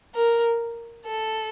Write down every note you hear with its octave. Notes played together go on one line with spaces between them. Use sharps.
A#4
A4